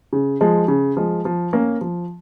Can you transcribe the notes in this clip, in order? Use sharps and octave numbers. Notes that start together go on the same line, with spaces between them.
C#3
F3 G#3
C#3
F3 G#3
F3
A#3 C#4
F3